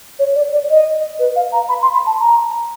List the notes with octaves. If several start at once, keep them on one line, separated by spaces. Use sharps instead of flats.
C#5
D5
D5
D#5
B4
F5
A#5
B5
C6
B5
A5
A#5